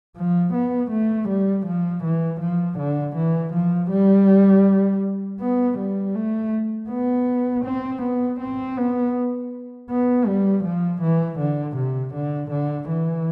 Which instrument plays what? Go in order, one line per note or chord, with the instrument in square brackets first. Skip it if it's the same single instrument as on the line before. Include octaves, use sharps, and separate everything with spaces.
[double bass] F3
B3
A3
G3
F3
E3
F3
D3
E3
F3
G3
B3
G3
A3
B3
C4
B3
C4
B3
B3
G3
F3
E3
D3
C3
D3
D3
E3